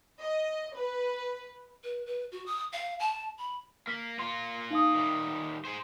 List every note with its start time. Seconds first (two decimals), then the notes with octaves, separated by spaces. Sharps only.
0.21 D#5
0.74 B4
1.83 B4
2.06 B4
2.32 F#4
2.46 D#6
2.72 F5
2.99 A5
3.38 B5
3.87 A#3 F6 B6
4.19 A#3 F4 C6
4.70 D#4 F5 D#6
4.94 D#3 G3
5.65 G#4 C5